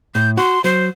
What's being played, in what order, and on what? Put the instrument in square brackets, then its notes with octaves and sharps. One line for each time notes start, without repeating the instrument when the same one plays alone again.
[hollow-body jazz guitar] A2 [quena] G6
[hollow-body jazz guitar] F#4 [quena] C6
[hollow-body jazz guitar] F#3 [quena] C5